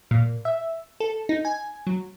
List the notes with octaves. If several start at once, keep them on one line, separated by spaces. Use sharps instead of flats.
A#2
E5
A4
D#4
G#5
F#3